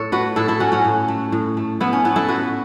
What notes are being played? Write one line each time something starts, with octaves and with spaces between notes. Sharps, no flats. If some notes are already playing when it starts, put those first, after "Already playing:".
Already playing: A2 A4 C#5
A3 F#4 B4
A2 E4 A4
E4 A4
A3 C#4 F#4
C#4 F#4
A2
A3
A2
A3
A2 B3 E4
C#4
A3 B3 E4
E4 A4
A2 F#4 B4